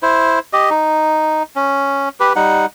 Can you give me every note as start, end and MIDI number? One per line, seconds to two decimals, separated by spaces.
0.03 0.39 64
0.03 0.39 72
0.53 0.70 67
0.53 0.70 75
0.70 1.43 63
1.56 2.09 61
2.20 2.33 67
2.20 2.33 71
2.36 2.66 55
2.36 2.66 63
2.36 2.66 78